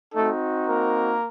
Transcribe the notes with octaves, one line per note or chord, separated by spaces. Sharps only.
A3 C4 D#4 F#4 A4
A#3 A#4